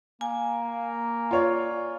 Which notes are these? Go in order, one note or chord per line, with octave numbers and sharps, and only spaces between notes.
A#3 G#5
F4 C#5 D5